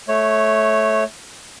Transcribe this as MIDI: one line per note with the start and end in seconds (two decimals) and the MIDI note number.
0.08 1.04 57
0.08 1.04 73